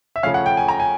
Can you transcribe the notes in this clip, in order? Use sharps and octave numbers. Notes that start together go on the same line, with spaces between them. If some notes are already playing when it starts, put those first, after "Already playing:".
E5
C#3 F3 A3 C#4 F5
F#5
G5
G#5
A#5
G#5